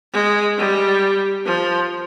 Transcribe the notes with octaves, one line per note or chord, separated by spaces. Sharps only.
G#3
G3
F3